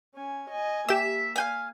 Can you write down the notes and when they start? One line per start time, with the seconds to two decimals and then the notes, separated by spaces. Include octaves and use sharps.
0.15 C#4 G#5
0.50 D#5 G#5
0.89 A#3 G4 E5 E7
1.36 F5 G5 G#5